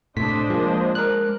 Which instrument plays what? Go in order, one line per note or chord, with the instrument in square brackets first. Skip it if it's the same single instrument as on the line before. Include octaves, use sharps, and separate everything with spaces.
[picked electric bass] A2 C3 [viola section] D4 C5 D#5 [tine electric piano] B6
[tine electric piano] F3 A#3 [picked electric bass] G#3
[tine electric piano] A#4 F#6